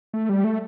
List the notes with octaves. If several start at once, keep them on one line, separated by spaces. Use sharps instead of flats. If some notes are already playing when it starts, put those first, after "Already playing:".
A3
G3
A3